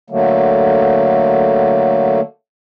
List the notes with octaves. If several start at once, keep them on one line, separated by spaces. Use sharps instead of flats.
D3 F#3 A3 A#3